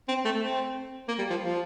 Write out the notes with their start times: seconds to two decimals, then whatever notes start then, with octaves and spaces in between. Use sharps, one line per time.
0.08 C4
0.25 A3
0.41 C4
1.08 A#3
1.19 G3
1.30 F3
1.41 F3